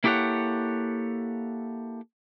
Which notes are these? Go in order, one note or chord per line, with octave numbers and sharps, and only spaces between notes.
A#3 E4 G4 A4 C#5 F#5